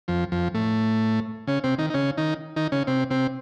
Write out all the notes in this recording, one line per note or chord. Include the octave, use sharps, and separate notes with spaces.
F2 F3
F2 F3
A2 A3
C#3 C#4
C3 C4
D#3 D#4
D#4
C#3 C#4
D#3 D#4
D#3 D#4
C#3 C#4
C3 C4
C3 C4